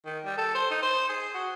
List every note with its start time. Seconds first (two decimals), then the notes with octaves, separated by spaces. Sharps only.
0.06 D#3
0.25 G3
0.38 A4
0.55 C5
0.71 D#4
0.83 C5
1.09 G#4
1.34 F#4